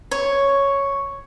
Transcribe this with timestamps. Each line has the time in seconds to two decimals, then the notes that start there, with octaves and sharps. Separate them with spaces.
0.11 C#5